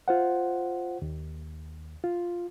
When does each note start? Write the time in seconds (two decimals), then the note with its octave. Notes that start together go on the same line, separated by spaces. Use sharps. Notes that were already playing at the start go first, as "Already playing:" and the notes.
0.08 F4 C5 F#5
1.02 D#2
2.04 F4